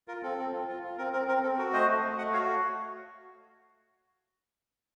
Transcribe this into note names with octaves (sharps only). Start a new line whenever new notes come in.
F4 A#4
C4 A4
C4
F4
F4
F4
C4 A#4
C4 A#4
C4 A#4
C4 A4
F#4 A#4
A3 C5 D#5
A3
A3
A3 D#5 F#5
F#4 C#5 F5